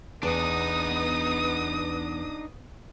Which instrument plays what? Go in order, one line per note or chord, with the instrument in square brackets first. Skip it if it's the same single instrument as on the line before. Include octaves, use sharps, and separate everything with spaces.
[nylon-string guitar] E2 [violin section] B3 D#6 [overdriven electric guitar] D4 D#4